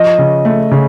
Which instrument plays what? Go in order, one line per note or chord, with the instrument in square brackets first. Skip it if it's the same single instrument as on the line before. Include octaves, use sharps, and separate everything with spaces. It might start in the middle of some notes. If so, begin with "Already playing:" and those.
Already playing: [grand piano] F3 [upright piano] D#5
[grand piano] C#3
A3
C#3